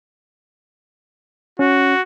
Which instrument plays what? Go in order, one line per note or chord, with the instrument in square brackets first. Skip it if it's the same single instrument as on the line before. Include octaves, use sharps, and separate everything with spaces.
[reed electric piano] C#4 [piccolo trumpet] F#4